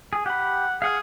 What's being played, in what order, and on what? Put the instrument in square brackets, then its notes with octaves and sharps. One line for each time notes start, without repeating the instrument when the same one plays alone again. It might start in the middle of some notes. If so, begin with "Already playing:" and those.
[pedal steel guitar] G#4
[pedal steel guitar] G4 B5 [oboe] F#5
[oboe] G#4 [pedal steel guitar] F5 F#5 F6